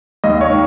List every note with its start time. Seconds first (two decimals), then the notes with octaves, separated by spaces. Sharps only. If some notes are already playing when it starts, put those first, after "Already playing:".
0.24 D#2 D#5
0.41 C#5
0.50 D#3